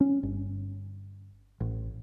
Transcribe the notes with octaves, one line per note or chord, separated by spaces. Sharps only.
C#4
G1
A1